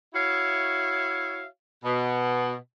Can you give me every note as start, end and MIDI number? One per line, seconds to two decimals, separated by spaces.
0.14 1.45 64
0.14 1.45 66
0.14 1.45 73
0.14 1.45 76
0.14 1.45 77
1.84 2.55 47